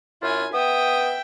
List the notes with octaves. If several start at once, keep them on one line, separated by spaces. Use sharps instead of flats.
F#2 E4 F4 G#5
B3 E5 G5 D#6